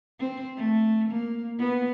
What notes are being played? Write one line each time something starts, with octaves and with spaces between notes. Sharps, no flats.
C4
A3
A#3
B3